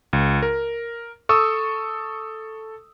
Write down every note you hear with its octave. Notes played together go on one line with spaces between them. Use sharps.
C#2
A#4
A4 C#6 D#6 E6